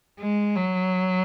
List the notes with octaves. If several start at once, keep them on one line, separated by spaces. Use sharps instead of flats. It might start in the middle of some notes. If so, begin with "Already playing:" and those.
G#3
F#3